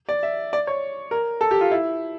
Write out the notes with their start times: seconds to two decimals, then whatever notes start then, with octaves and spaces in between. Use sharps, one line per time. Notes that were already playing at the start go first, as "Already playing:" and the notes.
0.09 D5
0.23 E5
0.53 D5
0.67 C#5
1.11 A#4
1.41 A4
1.51 G4
1.61 F4
1.71 E4